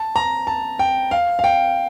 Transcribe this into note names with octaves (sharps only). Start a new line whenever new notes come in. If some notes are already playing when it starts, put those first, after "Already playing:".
Already playing: A5
A#5
A5
G5
F5
F5
G5